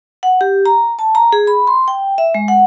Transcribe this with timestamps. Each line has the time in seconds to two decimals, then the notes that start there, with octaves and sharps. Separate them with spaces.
0.23 F#5
0.41 G4
0.66 A#5
0.99 A5
1.15 A#5
1.33 G#4
1.47 B5
1.67 C6
1.88 G5
2.18 E5
2.35 G#3
2.48 F#5